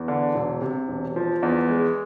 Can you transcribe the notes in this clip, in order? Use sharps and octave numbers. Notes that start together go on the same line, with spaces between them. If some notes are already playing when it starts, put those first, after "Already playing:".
Already playing: E2
D3
E1
C3
E1
F3
E2
G#3